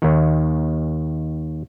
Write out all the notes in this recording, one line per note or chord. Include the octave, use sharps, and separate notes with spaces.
D#2 D#3